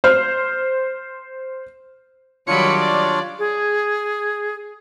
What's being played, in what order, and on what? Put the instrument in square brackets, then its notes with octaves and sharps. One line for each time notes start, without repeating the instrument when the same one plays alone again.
[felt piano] C5 F6
[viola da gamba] D#3 F#3 G3 [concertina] D4 F4 C#5 [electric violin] B5 C#7
[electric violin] D5
[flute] G#4